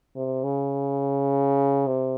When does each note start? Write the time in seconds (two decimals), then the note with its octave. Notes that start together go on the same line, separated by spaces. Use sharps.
0.16 C3
0.44 C#3
1.87 C3